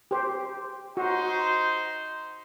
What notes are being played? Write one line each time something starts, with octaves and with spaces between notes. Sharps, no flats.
G4 C5
D#4 F#4 C5